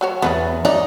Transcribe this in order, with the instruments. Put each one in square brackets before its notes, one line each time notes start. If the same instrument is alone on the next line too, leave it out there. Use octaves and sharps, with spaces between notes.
[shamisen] F#3 F#4 C#5
[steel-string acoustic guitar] E2 [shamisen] B3 C#4 B4
[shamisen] F#3 D4 D5 [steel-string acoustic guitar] D#4